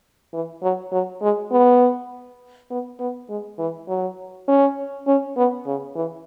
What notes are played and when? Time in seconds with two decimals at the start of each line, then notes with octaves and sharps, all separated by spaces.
0.33 E3
0.63 F#3
0.92 F#3
1.22 G#3
1.51 B3
2.70 B3
2.99 B3
3.29 G#3
3.58 E3
3.88 F#3
4.48 C#4
5.07 C#4
5.36 B3
5.66 C#3
5.95 E3